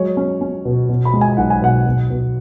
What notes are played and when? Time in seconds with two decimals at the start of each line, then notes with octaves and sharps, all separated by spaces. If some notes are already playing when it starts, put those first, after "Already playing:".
Already playing: F#3 G#3 C#5
0.17 C#4
0.41 C#4
0.65 B2
0.89 B2
1.05 B5
1.14 G#3
1.21 G#5
1.37 B1 F#5
1.50 G#5
1.62 B2 F#5
1.86 B2
2.10 B2